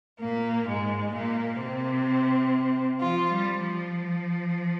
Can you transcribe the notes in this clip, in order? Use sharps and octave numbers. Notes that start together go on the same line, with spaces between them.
A#2 A#3
G#2 G#3
A#2 A#3
C3 C4
F3 F4
G3
F3